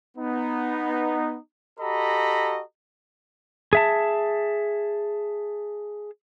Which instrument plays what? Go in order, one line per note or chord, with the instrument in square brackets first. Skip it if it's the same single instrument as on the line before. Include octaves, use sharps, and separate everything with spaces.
[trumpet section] B3 D#4
F#4 G4 A4 D#5 A#5 B5
[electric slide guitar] G#4 E5 A5